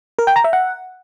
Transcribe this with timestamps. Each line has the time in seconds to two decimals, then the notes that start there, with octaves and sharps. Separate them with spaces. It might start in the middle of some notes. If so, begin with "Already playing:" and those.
0.19 A#4
0.27 G5
0.36 A#5
0.44 E5
0.53 F#5